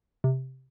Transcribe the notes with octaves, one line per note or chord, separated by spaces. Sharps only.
C3